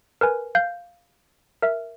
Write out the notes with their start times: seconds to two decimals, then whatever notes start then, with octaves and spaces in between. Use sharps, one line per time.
0.21 A#4 B4 G#5
0.55 F5 G6
1.62 A#4 E5